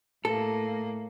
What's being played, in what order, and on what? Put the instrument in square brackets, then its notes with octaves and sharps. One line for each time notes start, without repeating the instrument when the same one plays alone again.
[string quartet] A2 A#3 [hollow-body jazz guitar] A4